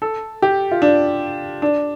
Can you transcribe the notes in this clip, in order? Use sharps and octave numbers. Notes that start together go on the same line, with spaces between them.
A4
G4
F4
D4
D4